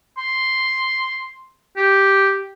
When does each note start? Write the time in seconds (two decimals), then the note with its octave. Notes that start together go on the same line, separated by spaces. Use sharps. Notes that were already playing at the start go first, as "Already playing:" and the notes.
0.17 C6
1.77 G4